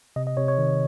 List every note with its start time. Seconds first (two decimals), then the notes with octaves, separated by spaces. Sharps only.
0.16 C3 D#5
0.27 D#5
0.37 C3 C#5
0.48 C#5
0.58 D#3